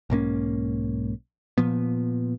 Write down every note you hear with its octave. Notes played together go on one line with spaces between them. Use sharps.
B1 G#2 A#3 C#4
A#2 F3 B3